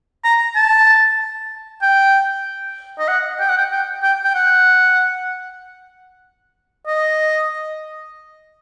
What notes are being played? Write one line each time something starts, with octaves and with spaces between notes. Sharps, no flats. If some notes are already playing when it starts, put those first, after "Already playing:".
A#5
A5
G5
D#5
F#5
G5
F#5
G5
G5
G5
G5
F#5
D#5